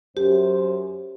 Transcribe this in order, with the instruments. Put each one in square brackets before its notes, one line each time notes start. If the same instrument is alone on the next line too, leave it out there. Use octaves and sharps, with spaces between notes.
[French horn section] F#2 C5 [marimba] G4